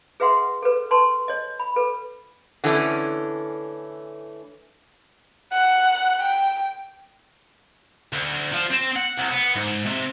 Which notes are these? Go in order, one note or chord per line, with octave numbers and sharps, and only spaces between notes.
G#4 B4 E5 F#5 C6
A4 B4
B4 A5 C6 C#6
C#5 D#5
B5
A4 B4
D3 E3 A3 C#4
F#5
G5
D2
F3
C4
F#5
C2
B3
G#2
C3